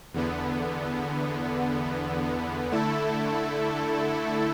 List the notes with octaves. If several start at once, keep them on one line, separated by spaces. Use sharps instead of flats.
E2 D3 B3
D3 A3 E4 A4